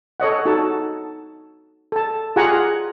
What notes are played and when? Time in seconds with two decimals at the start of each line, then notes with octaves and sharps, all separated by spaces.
0.20 A4 C#5 D#5 F#5
0.45 D#4 F#4 A4 A5
1.92 A4 A5
2.36 F4 G4 G#4 F#5 G#5 A#5